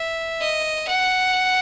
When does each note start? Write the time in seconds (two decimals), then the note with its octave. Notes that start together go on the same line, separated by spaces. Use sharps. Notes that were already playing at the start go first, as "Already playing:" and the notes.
Already playing: E5
0.41 D#5
0.87 F#5